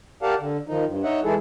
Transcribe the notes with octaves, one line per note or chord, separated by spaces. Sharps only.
G4 A#4 D5 F5 F#5 A5
D3
D#3 F3 D#4
G2
D#4 C#5 D#5 E5 F#5
E3 G#3 E4 G#4 A4